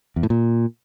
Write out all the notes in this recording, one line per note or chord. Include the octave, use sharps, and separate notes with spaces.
E2
A2
A#2